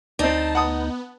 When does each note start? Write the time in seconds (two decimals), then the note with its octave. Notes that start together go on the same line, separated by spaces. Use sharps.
0.19 D2 C4 D#4 D5 A5
0.55 B3 F#5 A5 D#6